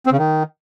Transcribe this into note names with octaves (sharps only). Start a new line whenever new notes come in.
C4
C#3
D#3